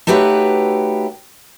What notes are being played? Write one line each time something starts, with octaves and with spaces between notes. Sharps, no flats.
A3 D#4 F#4 G4 B4 C#5